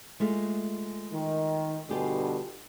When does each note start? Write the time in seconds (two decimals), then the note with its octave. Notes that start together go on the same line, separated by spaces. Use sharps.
0.20 G#3 A3 F4
1.12 D#3
1.89 G2 B2 D3 F4 G4 G#4